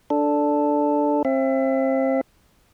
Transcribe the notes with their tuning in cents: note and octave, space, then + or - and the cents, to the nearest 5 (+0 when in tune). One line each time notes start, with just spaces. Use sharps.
D4 +0 A4 +0
C4 +30 E5 +30